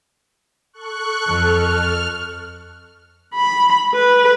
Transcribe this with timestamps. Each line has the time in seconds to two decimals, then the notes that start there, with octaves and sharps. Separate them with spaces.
0.73 A4 C#6 F#6
1.27 F2 F6 F#6
3.35 B5
3.95 B4